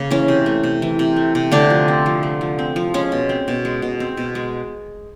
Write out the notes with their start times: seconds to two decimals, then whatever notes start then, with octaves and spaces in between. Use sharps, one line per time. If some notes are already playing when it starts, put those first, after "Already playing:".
Already playing: C#3 A#3
0.10 E3 C#4
0.28 C3
0.46 A3
0.63 C3
0.82 E3
0.99 C3
1.16 A3
1.35 C3
1.52 D3 A3 D4
1.70 F3
1.88 C4
2.06 F3
2.23 A3
2.41 F3
2.59 C4
2.76 F3
2.94 G#3 C#4
3.12 B2
3.29 C4
3.48 B2
3.65 G#3
3.82 B2
4.00 C4
4.17 B2
4.35 G#3